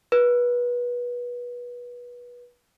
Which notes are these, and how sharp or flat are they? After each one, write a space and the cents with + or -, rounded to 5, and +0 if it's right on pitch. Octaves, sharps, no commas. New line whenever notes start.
B4 -25